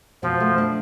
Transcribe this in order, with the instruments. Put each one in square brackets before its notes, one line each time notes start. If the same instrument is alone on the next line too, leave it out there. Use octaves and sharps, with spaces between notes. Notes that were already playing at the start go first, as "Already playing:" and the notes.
[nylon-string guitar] B2 [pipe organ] F3
[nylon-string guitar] A3
D4